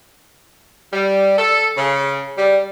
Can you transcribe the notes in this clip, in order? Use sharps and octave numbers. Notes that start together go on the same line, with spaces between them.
G3
A4
C#3
G3